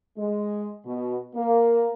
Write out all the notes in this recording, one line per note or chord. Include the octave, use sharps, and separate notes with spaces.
G#3
B2
A#3